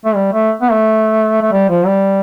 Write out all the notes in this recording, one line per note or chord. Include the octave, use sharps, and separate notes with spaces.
A3
G3
A3
B3
A3
A3
G3
F3
G3